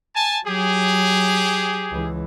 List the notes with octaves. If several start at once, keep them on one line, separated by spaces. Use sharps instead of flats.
G#5 A5
F#3 G4 G#4
C#2 E3